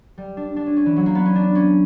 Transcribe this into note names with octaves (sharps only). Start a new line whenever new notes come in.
G3
D4
D4
C#4
C#4
E3
F#3
A#3
B3
C#4
D4
C#4